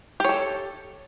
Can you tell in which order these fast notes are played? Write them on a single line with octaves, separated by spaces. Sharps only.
G4 C#5 A4